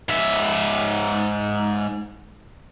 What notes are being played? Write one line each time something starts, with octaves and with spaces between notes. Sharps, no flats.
G#2 E5